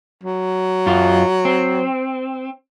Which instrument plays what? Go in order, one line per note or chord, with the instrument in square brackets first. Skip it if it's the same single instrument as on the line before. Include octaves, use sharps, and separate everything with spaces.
[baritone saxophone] F#3
[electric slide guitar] F#2 F4
C4